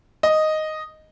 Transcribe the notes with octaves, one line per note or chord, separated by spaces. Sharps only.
D#5